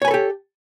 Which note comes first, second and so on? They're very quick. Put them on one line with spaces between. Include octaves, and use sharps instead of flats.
C#5 G#5 B4 A4 G4